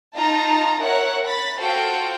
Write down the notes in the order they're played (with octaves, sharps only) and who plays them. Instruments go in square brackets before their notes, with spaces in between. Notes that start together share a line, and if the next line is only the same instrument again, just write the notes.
[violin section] D#4 F4 A5 A#5
A#4 C#5 E5 F#5 F#6
B5 A6 B6
F4 F#4 A4 C5 F5 G5